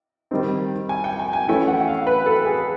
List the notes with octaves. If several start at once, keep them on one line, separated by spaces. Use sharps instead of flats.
D#3 G3 C4 D#4
G#5
G5
G#5
G#5
E3 A3 C#4 E4 G5
F#5
F5
B4
A4
G#4